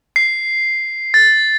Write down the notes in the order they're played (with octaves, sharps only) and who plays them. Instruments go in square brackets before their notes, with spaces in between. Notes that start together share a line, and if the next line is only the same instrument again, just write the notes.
[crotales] C7
A6